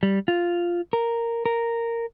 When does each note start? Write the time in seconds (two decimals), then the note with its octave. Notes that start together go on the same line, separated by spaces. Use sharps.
0.03 G3
0.28 F4
0.93 A#4
1.46 A#4